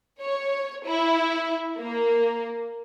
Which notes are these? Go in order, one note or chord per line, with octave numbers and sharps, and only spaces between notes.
C#5
E4
A#3